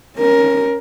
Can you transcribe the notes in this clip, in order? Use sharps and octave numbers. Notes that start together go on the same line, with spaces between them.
C#4 A#4